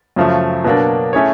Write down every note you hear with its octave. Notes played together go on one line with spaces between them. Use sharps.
F#2 C#3 F3 A3
B2 F#3 A#3 D4
A3 C#4 E4 G#4 C#5